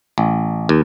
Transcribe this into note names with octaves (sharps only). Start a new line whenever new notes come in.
A1
D#2